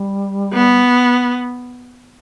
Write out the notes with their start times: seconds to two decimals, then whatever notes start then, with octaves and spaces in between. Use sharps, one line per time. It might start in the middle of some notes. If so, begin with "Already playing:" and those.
Already playing: G3
0.53 B3